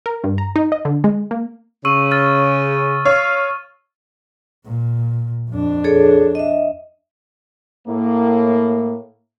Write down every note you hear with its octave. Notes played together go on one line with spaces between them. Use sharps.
A#4
G2
A#5
D#4
D#5
D3
G#3
A#3
C#3 C#6 E6 D#7
E6 F6 A6
C#5 F5
A#2
F2 D4
G#4 A4 C#5
D#5 E5
A2 A#3